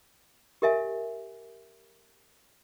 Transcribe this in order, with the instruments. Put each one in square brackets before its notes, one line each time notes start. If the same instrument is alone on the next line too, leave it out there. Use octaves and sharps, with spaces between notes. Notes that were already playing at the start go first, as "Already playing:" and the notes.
[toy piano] G4 A#4 D#5 E5 G#5